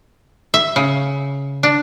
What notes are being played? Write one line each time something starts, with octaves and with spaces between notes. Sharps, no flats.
E5
C#3
D4